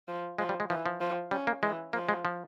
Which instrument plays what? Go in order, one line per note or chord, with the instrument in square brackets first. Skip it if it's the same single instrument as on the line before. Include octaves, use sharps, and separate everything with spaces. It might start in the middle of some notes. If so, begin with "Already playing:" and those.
[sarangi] F3
[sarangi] F3 [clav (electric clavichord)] G#3
[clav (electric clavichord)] G3
G#3
[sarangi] E3 [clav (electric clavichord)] F3
[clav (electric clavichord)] F3
[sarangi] F3
[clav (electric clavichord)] G3 [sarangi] C#4
[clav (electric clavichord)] A#3
[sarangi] E3 [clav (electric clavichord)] G#3
[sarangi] F3 [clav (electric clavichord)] A#3
[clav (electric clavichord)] G#3
F3